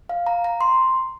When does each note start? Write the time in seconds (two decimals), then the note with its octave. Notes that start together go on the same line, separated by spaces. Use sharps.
0.09 F5
0.27 A#5
0.44 A#5
0.61 C6